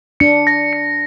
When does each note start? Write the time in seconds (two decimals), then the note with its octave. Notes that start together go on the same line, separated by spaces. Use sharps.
0.20 D4 C#7
0.47 A#6
0.73 C#7